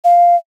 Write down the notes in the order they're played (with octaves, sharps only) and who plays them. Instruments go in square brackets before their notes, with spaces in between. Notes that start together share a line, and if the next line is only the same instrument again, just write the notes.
[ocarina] F5